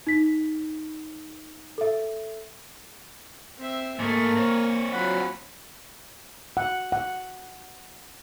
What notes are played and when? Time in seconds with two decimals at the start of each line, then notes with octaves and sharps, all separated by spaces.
0.07 D#4 B6
1.78 A4 E5
3.58 C4 E5
3.99 G#2 A3 A#3 A#4 G#5 C#6
4.36 C4 C#5
4.92 F#3 F4 F#5 B5
6.57 F#5
6.92 F#5